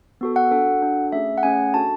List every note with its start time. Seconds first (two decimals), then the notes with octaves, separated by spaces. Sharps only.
0.21 B3 F#4 A4
0.36 F#5
0.51 D4 F#4 A4
0.82 D4 F#4 A4
1.12 A3 C#4 G#4 E5
1.38 F#5
1.43 A3 C#4 G#4 G#5
1.74 D4 F#4 A4 A5